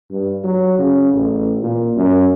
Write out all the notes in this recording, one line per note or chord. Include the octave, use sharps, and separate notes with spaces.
G2
F#3
C#3
A1
A#2
F#2